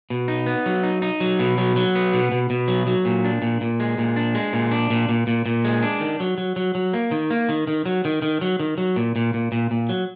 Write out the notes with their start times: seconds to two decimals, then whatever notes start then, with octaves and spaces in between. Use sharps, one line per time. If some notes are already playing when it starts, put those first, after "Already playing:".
0.10 B2
0.28 D#4
0.46 B3
0.66 F#3
0.83 D#4
1.02 D#4
1.20 F#3
1.39 B2
1.58 F#3
1.76 F#3
1.95 B3
2.13 B2
2.32 B2
2.50 B2
2.68 F#3
2.87 F#3
3.05 A#2
3.25 D4
3.42 A#2
3.61 A#2
3.80 G#3
3.98 A#2
4.16 D4
4.35 G#3
4.53 A#2
4.71 D4
4.90 A#2
5.09 A#2
5.27 A#2
5.46 A#2
5.64 G#3
5.83 D4
6.01 D#3
6.20 F#3
6.38 F#3
6.56 F#3
6.75 F#3
6.94 A#3
7.11 D#3
7.30 A#3
7.49 D#3
7.67 D#3
7.86 F#3
8.05 D#3
8.22 D#3
8.41 F#3
8.60 D#3
8.78 F#3
8.96 A#2
9.16 A#2
9.34 A#2
9.52 A#2
9.71 A#2
9.89 F#3